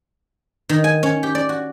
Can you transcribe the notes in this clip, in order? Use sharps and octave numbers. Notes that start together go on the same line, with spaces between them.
D#3
G#5
C#4
G4
D5
F#4